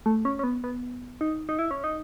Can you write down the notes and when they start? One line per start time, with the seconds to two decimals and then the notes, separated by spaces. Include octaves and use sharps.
0.06 A3
0.25 C#4
0.39 C#4
0.44 B3
0.64 B3
1.21 D#4
1.49 D#4
1.59 E4
1.71 C#4
1.84 D#4